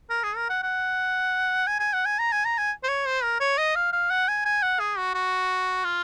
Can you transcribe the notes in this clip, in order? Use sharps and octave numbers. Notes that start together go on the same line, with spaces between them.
A#4
G#4
A#4
F#5
F#5
G#5
G#5
F#5
G#5
A#5
G#5
A#5
G#5
C5
C#5
C5
A#4
C#5
D#5
F5
F5
F#5
G#5
G#5
F#5
G#4
F#4
F#4
F4